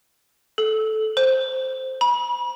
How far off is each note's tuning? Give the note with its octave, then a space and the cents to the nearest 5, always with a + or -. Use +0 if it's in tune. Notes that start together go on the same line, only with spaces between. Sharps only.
A4 -15
C5 +0
B5 -35